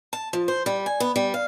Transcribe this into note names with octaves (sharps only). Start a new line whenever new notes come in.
A5
F3
C5
G3
G#5
B3
G3
F5